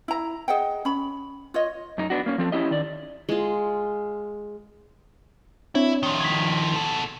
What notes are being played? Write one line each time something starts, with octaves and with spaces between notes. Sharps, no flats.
E4 A#5
G#4 D#5 F#5 G5
C#4 B5
F4 C#5 D#5
F#2 D#4
B3 D4 F#4
A#3 C#4
F3 C4 A4
C#4 E4 G4 D#5
D#3 D5
G#3 F4
C4 D4 E4 C#5
D#3 F3
G#6 B6
B2 A4